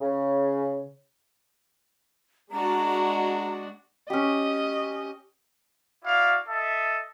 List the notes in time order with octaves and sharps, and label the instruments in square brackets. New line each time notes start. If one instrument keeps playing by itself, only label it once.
[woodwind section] C#3
[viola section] G#3 D4 F#4 [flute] A#5
[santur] C#4 G4 [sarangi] D#5
[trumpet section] E4 F#4 D5 F5
A4 D#5 E5